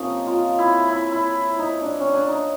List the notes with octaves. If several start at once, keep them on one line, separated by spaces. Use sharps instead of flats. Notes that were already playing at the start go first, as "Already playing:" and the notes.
Already playing: C3 F3 A#3 C#4 D#4
F4
E4
E4
E4
D#4
D4
C#4
D4
D#4